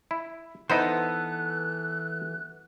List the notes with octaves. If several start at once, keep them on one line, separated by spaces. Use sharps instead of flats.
E4
E3 B3 D#4 E4 A4 C5 F#6